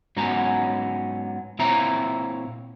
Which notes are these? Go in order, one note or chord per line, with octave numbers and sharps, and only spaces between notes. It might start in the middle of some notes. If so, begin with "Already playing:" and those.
G#2 F#3 B3 C#4 A#5
A#2 C4 E4 C#5 E5 A#5